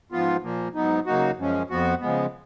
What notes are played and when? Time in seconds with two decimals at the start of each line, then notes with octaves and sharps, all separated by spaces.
0.12 G#2 F3 B3 F4
0.43 A#2 F3 A#3
0.75 G#2 F#3 B3 D#4
1.06 C#3 F#3 A#3 D#4 F#4
1.38 F#2 F3 G#3 C#4
1.70 F2 F3 B3 F#4
2.01 C#3 F3 G#3 B3